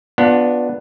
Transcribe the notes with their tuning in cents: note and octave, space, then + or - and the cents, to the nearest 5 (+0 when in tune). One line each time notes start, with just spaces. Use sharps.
B3 +0 D4 +0 F4 +25